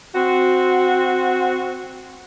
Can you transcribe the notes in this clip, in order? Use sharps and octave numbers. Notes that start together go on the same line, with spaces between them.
C4 F#4